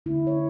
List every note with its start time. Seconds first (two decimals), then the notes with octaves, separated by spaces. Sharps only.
0.06 D3 A3 E4
0.27 C#5